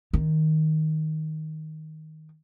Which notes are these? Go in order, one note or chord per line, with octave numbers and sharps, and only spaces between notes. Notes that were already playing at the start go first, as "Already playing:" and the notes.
D#3